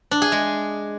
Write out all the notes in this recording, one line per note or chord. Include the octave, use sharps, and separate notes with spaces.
D4
G#4
G#3